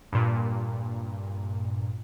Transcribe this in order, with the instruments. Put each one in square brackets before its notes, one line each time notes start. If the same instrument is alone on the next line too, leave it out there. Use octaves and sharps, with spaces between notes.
[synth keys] G2 A#2